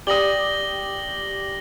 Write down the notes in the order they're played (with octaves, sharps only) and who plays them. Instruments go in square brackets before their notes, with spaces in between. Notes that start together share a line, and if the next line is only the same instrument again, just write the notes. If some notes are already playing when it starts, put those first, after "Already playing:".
[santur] G4 [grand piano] D5 D#6 [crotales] A#6 F#7 G7